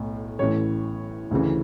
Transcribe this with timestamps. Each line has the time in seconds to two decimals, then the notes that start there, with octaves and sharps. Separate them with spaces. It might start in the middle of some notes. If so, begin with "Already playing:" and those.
Already playing: B1 A2
0.39 A1 A2 E3 C#5
1.31 D2 C#3 E3